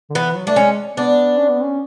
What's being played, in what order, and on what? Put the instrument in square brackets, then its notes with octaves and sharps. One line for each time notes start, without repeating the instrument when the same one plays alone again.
[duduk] D3
[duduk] E3 [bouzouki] B3
[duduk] F#3
[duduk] A3 [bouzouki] D4
[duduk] G#3 [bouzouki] C#4
[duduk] B3 [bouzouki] D4
[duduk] C#4
B3
C#4